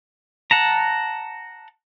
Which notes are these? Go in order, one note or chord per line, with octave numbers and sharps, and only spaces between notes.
F#5 A5 A#5